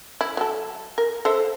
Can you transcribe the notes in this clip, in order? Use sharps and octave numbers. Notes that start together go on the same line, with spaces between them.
E4
F#3 A4
A#4
A4 C5 E5